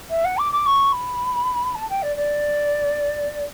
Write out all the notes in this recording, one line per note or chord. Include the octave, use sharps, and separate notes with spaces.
E5
F#5
D6
D6
C#6
B5
A5
G5
D5
D5